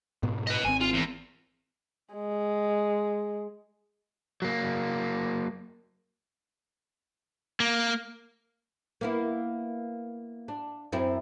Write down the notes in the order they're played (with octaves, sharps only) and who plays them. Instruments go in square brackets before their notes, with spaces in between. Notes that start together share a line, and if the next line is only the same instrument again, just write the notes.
[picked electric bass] G#2 B2 B3
[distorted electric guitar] B4 D#5
[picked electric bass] G#1 C4 [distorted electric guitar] G#5
[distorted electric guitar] F4
E2
[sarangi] G#3
[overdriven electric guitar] F#3 A#3
A#3
[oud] A#3 B3 E4
D4
F#2 C4 E4